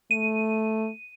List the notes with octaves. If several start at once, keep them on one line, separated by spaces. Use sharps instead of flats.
A3 D#7